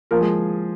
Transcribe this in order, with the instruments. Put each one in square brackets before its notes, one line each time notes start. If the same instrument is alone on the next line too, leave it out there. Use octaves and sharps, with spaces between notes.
[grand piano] F3 [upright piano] A#3 A#4
[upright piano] G#3 G#4